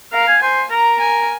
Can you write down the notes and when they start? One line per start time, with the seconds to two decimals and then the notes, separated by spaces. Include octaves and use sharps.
0.13 A#4 F5
0.28 G#5
0.42 C5 G#5
0.71 A#4 A#5
1.00 G#5